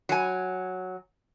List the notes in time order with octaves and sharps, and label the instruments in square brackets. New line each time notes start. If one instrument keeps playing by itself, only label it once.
[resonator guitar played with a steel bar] F#3 G#5